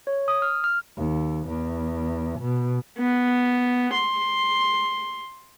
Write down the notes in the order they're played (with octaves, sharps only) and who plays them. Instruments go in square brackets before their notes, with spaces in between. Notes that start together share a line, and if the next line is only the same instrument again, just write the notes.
[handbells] C#5
D#6
F6
F6
[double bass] D#2
E2
B2
[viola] B3
C6